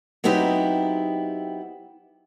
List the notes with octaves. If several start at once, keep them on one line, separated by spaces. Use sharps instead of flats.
F#3 B3 C4 D#4 E4 G4